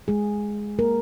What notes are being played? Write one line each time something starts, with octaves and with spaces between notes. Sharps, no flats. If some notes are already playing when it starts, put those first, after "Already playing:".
G#3 G#4
A#3 A#4